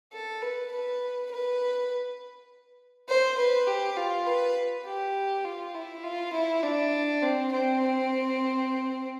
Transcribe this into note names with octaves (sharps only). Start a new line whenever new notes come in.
A4
B4
B4
B4
C5
B4
G4
F4
B4
G4
F4
E4
F4
E4
D4
C4
C4